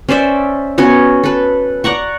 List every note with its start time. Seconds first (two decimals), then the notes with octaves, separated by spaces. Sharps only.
0.09 C#4 C5 D5 E5
0.78 B3 C#4 F#4 C#5
1.24 A4 B4
1.84 D5 F#5 A#5 C#6